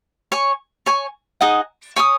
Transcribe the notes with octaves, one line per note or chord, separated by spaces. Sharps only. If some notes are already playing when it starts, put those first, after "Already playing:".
C#5 G#5 C#6
C#5 G#5 C#6
D#4 G#4 D#5 F#5
C#5 G#5 D#6